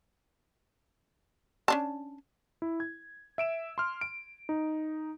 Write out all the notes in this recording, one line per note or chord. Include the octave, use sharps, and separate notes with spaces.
C#4 D4 A5
E4
G#6
E5 D7 E7
C6 F6
D7
D#4